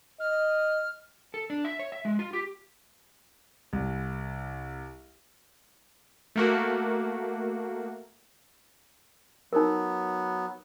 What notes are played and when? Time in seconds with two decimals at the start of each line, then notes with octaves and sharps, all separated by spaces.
0.20 D#5 F6
1.34 A4
1.50 D4
1.65 E5
1.79 C#5
1.92 E5
2.05 G#3
2.19 F4
2.33 G4
3.73 C2
6.36 A3 A#3 F#4
9.53 F#3 B3 D#4 A#4